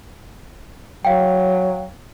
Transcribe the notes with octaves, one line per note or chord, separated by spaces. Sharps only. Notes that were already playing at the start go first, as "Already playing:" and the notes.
F#3 F5 G5